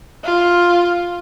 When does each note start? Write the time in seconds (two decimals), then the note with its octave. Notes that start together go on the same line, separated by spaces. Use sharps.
0.25 F4